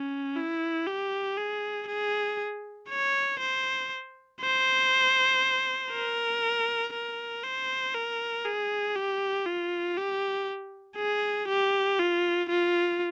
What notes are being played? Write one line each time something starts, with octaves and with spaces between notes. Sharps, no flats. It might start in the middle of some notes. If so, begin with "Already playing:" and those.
Already playing: C#4
E4
G4
G#4
G#4
C#5
C5
C5
A#4
A#4
C5
A#4
G#4
G4
F4
G4
G#4
G4
F4
F4